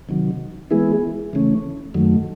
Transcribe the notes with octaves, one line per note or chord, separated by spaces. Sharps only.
C3 D#3 F#3
E3 G#3 B3 E4 G#4
C#3 E3 A3 C#4
F#2 D#3 F#3 A3